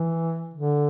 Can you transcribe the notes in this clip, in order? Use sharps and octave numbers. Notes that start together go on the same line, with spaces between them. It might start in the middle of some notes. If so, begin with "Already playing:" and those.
Already playing: E3
D3